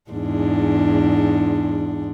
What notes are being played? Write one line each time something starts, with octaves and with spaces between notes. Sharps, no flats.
E2 G#2 D4